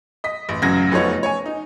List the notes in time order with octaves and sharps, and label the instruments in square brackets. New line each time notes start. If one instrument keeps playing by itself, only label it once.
[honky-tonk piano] D#5 B6
A1
A1 F#2 C#3 F#3 G#6 A#6
F1 F3 A3 B3 D#4 C#5
C#5 G#5
D#4